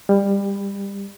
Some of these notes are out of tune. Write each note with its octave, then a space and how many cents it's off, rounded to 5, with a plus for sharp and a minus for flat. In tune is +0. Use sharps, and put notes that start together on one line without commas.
G3 +25